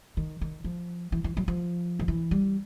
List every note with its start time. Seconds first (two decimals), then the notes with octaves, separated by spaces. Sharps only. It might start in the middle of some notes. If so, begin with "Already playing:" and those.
0.17 D#3
0.41 D#3
0.64 F3
1.12 E3
1.24 E3
1.37 F#3
1.48 F3
1.99 D#3
2.08 E3
2.31 G3